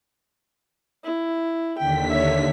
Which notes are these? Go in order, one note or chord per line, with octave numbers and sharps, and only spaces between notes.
E4
D#2 D3 G5 B6
C#5 E5